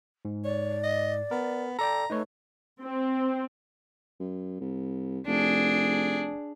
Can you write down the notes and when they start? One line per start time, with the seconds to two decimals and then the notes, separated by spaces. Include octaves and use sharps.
0.25 G#2
0.44 C#5 D5
0.84 D#5
1.31 B3 A#4
1.79 A4 D5 G5 A#5
2.10 A3 D#4 B4 C#5
2.81 C4
4.20 F#2
4.60 C2
5.26 F1 D4 G#4